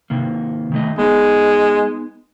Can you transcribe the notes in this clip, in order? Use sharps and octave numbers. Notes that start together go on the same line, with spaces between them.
C3 D#3 A#3
D#3 A3 D#5
G#3 B3 D#4